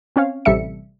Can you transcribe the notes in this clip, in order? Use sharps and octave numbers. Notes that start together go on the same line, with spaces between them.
C4 C#4 C#5 F5
A1 C3 G3 A4 E5 C#7